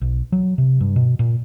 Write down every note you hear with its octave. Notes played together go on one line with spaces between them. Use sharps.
B1
F#3
C3
G2
B2
A#2